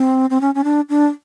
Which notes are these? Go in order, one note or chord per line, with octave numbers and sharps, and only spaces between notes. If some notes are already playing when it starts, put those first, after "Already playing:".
Already playing: C4
C4
C#4
C#4
D4
D4